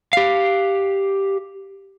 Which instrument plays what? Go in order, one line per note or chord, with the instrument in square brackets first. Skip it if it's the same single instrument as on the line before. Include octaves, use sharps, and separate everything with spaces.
[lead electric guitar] G4 F5